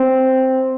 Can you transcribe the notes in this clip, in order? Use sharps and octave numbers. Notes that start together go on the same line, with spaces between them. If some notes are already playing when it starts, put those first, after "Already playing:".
Already playing: C4